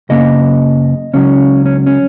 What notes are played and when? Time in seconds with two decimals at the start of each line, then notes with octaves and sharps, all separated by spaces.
0.09 F#2 C#3 A#3 C#4 D#5
1.13 C#2 C#3 F#3 C#4
1.66 C#4
1.87 C#4